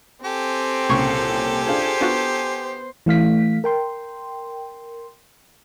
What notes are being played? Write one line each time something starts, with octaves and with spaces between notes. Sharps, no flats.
C4 G4 A4 G#5
C2 A#2 C#3 C#4 C#6 G#6
D4 F4 G#4 C5
B3 D4 F4 F#4
E3 A3 F5 B6
A#4 G5 C6